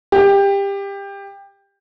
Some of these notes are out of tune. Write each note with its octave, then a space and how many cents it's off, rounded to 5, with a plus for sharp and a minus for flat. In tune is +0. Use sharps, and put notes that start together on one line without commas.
G4 +20